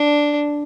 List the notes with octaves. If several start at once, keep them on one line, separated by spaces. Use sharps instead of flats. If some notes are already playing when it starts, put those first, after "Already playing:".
Already playing: D4